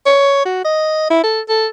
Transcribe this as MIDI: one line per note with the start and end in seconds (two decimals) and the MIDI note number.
0.06 0.41 73
0.45 0.59 66
0.65 1.10 75
1.10 1.20 64
1.24 1.41 69
1.49 1.67 69